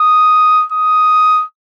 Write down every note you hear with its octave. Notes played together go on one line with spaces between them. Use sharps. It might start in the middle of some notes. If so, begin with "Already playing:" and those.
Already playing: D#6
D#6